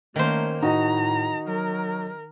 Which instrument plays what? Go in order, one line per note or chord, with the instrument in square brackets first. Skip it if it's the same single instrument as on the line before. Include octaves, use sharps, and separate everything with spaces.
[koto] D#3 C5 [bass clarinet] A3 [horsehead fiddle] A#3 C#4
[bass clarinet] A2 [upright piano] D#4 F#4 D#5 [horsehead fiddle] A#5
[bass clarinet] F#3 [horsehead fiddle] A#4